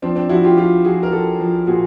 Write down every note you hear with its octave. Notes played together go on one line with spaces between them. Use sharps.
F3 C4 D4
C4 D4
F3 E4 F#4
F4 G4
F3 F4 G4
F3 F#4 G#4
A#4
F3 G4 A4
F3
A#2 F#4 G#4